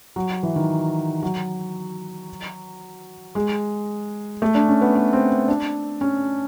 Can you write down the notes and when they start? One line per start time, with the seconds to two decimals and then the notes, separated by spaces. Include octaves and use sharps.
0.16 F#3
0.43 E3
0.56 D#3
1.23 F#3
3.35 G#3
4.42 A3
4.55 D4
4.69 C#4
4.81 B3
4.95 B3
5.13 C4
5.48 D4
6.01 C#4